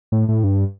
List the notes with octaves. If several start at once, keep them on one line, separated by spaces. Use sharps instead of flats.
A2
A2
G2